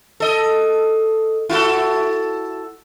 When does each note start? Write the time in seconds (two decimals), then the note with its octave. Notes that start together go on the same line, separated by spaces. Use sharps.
0.20 A4 D#5
1.49 E4 F#4 A4